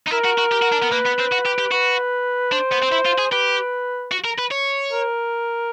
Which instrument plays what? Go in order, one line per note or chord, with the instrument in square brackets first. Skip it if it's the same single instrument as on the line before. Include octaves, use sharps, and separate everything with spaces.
[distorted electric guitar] D#4
[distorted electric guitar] E4 [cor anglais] A#4
[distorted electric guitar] F#4
F#4
G4
F#4
D4
B3
[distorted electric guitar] A#3 [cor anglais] B4
[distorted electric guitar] B3
C4
F#4
G4
G4
[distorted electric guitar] F#4 [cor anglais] B4
[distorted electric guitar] D4 [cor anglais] C5
[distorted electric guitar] B3
C4
E4
F4
G#4
[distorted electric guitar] G4 [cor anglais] B4
[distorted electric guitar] F#4
A#4
B4
C#5
[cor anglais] A#4